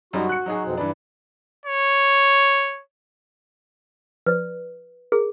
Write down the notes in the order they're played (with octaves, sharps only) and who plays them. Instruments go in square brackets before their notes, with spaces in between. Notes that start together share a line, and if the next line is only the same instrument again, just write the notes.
[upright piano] F#2 G3 D#4 [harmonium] F#4
[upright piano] F#6 C#7
F#3 D#4 G#4
[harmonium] F2 B2 C4
[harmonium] G2 B4 [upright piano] E3 D4
[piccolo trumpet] C#5
[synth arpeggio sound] F3 D5 [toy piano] B4
[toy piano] G#4 [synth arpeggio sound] A#4